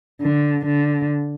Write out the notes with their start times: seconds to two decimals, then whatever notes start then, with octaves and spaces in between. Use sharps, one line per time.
0.21 D3
0.65 D3